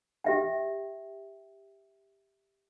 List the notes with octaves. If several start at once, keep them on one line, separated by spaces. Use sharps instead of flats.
G4 E5 G5